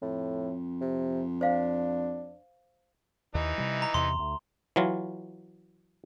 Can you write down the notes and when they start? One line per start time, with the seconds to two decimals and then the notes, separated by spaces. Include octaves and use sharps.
0.02 F2 A2
0.81 C3
1.41 D4 C5 F5
3.35 D#2 E3 D#4
3.58 C3 G3
3.82 A#5
3.94 E2 C3 C6
4.19 D2
4.76 E3 F#3 F4